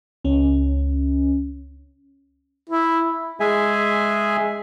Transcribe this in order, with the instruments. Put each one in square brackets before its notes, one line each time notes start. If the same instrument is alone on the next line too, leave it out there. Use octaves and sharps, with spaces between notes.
[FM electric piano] C#2 C#4
[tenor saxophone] E4
[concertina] G#3 G#4 E5 G#5